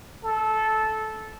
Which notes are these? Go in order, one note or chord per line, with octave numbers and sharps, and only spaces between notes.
A4